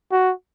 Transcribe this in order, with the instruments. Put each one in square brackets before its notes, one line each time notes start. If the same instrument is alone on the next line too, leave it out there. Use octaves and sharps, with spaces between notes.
[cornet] F#4